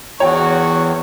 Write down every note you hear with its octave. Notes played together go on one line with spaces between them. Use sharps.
E2 F#4 C#5 G5